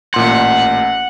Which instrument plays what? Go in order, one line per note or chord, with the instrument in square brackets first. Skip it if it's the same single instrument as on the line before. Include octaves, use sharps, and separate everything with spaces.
[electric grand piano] A1 A#2 C6 [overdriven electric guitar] F#5